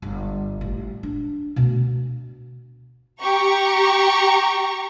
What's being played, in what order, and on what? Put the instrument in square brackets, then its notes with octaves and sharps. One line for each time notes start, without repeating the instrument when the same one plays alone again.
[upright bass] G1
A1
D4
D2 B2
[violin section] G4 A#5 C#6